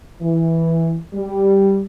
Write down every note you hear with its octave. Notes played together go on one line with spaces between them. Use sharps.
E3
G3